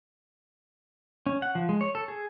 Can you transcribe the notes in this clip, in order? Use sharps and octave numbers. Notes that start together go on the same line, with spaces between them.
C#4
F#5
F3
G#3
C#5
A4
G#4